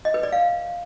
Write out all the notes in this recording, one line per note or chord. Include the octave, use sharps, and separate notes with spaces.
D#5
B4
D5
F5